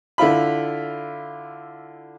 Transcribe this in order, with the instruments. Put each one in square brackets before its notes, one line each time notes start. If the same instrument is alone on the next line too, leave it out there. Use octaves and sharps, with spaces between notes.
[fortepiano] D3 E4 F4 B5